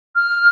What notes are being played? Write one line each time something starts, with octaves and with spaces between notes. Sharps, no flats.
F6